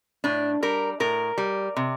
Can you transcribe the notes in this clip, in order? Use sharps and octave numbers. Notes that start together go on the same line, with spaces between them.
A2 D4
G3 A#4
A2 A#4
G3
C3